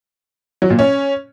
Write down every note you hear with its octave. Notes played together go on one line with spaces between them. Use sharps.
F#3
A#2
C#4